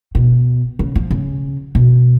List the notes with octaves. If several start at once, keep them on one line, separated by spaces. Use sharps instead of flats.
B2
C#3
F3
C#3
B2